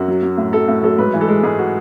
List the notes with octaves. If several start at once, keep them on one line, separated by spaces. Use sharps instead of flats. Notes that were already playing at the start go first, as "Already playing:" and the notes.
Already playing: F#2 F#4
F#3
F#3
A2
F#3 A4
A2
F#3 A4
G#2 B4
E3
A4
G#3
G#2 G#4
F#4